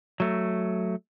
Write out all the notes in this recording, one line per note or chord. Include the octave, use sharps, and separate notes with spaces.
F#3 A3